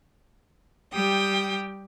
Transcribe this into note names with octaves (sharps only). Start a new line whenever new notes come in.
G3 G4 G5 D#6